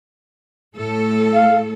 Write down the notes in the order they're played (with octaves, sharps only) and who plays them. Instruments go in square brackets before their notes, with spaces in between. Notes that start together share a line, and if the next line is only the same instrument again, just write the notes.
[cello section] A2 A3 A4
[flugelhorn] F5